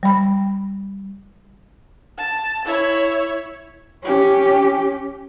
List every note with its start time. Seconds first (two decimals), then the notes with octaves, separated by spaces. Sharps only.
0.03 G3 B5
2.18 A5
2.65 E4 C#5
4.03 C#4 G4